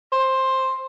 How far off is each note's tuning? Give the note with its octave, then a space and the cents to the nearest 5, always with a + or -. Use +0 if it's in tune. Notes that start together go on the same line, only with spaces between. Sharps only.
C5 +10